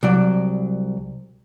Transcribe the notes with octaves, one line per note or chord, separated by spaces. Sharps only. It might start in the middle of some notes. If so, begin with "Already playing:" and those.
C2 F#3 D5